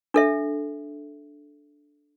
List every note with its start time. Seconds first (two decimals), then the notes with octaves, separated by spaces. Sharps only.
0.14 D4 A4 E5